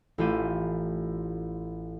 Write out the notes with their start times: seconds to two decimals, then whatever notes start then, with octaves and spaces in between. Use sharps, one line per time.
0.18 A1 A3 E4 F4 G4 D#7